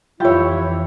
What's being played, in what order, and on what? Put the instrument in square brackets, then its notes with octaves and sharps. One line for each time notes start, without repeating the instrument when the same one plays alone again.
[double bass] F2 E3 [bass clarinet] E4 [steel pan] F4 E5 [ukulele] G4 C#5